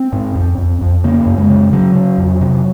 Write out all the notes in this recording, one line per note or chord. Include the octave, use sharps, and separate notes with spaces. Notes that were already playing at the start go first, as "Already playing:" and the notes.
Already playing: C4
G#2
F2
F2
F2
C#3 A#3
F#2
G#3
C#3
C#3 F#3
C#3
F2
C3